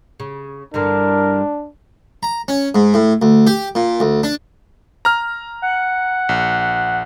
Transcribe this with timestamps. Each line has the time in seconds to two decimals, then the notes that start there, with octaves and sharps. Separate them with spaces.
0.20 C#3
0.74 G2 D3 E3 D4 A#4
2.23 A#5
2.48 C#4
2.75 G#2
2.94 A2
3.22 D2
3.47 G4
3.75 A#2
4.00 D2
4.23 D4
5.05 A#5 F6
5.62 F#5
6.29 A#1